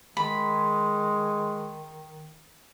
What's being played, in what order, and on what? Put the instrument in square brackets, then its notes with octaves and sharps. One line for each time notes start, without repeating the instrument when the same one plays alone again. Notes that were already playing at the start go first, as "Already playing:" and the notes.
[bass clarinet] D#3 [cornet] G#3 [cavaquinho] B5